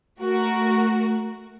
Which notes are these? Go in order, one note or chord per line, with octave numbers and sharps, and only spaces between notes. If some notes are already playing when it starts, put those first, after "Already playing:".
A3 F#4 A#4